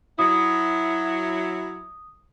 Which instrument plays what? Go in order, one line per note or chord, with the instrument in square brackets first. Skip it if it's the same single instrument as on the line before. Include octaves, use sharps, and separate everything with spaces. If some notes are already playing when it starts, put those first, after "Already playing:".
[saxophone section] F#3 E4 [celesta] D#6